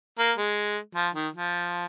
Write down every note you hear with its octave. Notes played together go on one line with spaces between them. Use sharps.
A#3
G#3
F3
D#3
F3